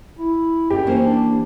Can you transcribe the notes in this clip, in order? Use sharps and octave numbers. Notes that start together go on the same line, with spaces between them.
E4
F#2 G4 D5
E3 A#3 C#4 C5
D4